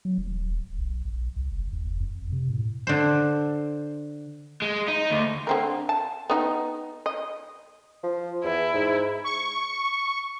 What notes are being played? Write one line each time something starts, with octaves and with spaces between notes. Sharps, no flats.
F#3
D#1
D1
B1
A#1
C2
F#1
E2
F#1
F2
C3
A2
D3 C5
G#3
D#4
D2
D3 C4 A#4
A5
B3 D#4 G4
D#5
F3
E2 E4
G#2
C#6